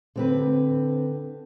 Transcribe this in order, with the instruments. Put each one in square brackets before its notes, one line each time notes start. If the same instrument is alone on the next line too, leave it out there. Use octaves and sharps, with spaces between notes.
[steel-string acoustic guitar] D3 C4 B4